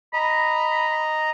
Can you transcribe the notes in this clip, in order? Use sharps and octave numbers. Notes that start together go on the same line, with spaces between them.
D#5 A#5 B5